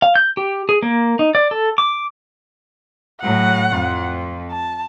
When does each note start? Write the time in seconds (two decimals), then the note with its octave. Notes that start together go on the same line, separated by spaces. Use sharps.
0.02 F5
0.16 G6
0.37 G4
0.69 G#4
0.82 A#3
1.19 D#4
1.35 D5
1.51 A4
1.78 D6
3.21 A2 F#3 F#5
3.70 F2
4.51 A5